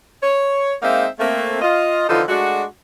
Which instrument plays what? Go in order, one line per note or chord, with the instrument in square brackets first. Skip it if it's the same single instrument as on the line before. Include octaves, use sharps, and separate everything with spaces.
[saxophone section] C#5
G#3 A#3 C4 D#4 E5 F5
A3 A#3 C4
F4 D#5
D3 E3 F3 D#4 F4 A4
G#3 A3 D4 F#4